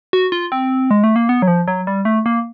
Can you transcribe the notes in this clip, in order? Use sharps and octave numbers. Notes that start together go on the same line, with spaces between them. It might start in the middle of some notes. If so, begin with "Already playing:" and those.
F#4
F4
C4
G#3
A3
A#3
B3
F#3
F3
F#3
G3
A3
A#3